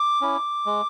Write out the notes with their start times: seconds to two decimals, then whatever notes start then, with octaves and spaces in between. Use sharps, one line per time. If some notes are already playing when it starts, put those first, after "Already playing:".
Already playing: D6
0.21 C#4 E4
0.66 G#3